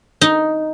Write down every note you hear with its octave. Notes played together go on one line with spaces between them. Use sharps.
D#4